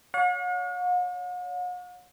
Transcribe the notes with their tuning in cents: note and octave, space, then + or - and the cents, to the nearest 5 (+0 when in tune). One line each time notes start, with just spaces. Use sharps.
C#5 +30 F#5 -45